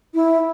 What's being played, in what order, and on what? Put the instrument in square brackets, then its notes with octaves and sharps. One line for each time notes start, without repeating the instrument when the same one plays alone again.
[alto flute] E4